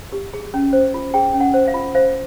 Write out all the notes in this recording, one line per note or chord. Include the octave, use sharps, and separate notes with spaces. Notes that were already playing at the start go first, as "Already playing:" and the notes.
G4
G#4
C#4
C5
F4
G#4 G5
C#4
F#5
C5
F5
F4
C5 F5